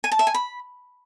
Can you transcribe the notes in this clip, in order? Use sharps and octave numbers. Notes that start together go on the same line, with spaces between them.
G#5
A5
E5
G#5
B5